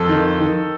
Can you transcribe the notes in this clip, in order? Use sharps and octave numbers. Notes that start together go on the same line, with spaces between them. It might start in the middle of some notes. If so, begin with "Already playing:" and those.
Already playing: F2 A4
D#3
D#3